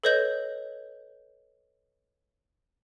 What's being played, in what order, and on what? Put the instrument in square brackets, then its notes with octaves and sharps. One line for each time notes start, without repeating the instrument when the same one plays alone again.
[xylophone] A4 B4 C#5 D#5 G6 F#7